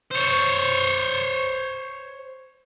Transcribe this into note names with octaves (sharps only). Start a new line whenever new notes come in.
C5 C#5